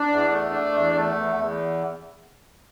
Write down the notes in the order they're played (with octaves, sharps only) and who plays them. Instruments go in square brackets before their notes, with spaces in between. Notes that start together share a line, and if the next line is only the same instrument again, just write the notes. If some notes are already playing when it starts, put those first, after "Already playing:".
Already playing: [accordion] D4
E2
A3
D4
E2
A3
E2
E2